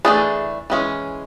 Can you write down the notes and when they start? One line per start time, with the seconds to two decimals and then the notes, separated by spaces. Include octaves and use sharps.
0.05 E3 A3 D4 G#4
0.70 E3 G#3 C#4